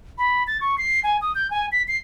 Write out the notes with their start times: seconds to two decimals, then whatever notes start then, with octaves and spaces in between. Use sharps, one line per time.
0.18 B5
0.47 A6
0.61 C#6
0.78 C7
1.04 G#5
1.21 D#6
1.35 G6
1.51 G#5
1.72 B6
1.88 C7